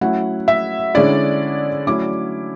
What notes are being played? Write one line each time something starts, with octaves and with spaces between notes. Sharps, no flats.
F#3 A3 C#4 E4 F#5
E5
D3 G#3 C#4 E4 D5
F#3 A3 C#4 E4 D6